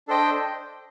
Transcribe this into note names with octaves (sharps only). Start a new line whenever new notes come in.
D4 A4 C5 D#5 G5